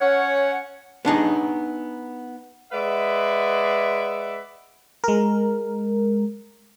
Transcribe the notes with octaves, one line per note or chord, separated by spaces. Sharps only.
C#4 C#5 F#5
B3 D4 D#4 G#4
G#3 B4 D5 E5 F#5
G#3 A#4